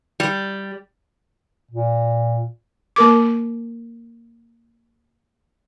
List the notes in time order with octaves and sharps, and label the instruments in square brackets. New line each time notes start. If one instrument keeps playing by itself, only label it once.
[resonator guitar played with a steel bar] G3
[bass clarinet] A#2
[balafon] A#3 A#4 D6